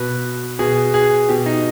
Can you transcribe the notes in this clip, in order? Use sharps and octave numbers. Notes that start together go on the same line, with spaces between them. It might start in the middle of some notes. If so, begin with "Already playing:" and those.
Already playing: B2 B4
B2 G#4
G#4
B2 G4
D#4